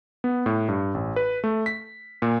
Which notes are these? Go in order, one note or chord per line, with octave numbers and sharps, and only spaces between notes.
B3
A2
G2
A1
B4
A3
B6
A#2